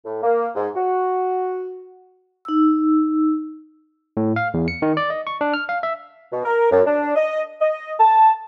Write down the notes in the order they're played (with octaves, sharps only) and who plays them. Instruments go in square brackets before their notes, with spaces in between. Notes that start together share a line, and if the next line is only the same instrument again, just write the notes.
[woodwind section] A2
A#3
G#2
F#4
[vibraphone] D#4 E6
[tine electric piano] A2
F5
E2
C#7
D#3
D5
D#5
C#6
D4
F6
F5
E5
[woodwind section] B2
A#4
F#2
D4
D#5
D#5
A5